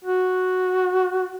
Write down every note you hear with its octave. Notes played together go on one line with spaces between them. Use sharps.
F#4